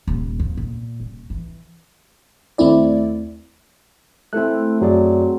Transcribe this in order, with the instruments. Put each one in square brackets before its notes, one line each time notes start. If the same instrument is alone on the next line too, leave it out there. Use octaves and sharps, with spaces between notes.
[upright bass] D#1
F2
A#2
D#1
E3
[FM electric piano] D#2 A3 C4 E4 D5
[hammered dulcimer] A3 C4 [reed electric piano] E4 A4 F#6
[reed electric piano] F#2 G#4 D5 [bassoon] F#3